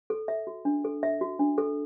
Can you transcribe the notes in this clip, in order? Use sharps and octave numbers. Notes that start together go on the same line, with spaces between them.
A4
E5
F#4
D4
A4
E5
F#4
D4
A4